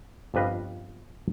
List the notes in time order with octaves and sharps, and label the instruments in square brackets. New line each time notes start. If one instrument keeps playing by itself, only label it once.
[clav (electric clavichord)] G1 F2 G3 B4 D#5 F5